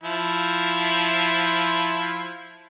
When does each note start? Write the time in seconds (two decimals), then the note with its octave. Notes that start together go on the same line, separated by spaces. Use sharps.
0.03 F3 E4